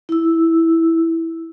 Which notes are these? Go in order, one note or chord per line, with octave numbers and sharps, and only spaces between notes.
E4 E6